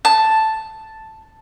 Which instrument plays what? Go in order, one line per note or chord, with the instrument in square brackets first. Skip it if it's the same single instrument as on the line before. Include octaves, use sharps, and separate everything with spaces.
[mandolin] A5